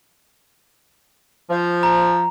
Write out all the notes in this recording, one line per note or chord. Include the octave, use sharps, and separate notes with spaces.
F3
A#5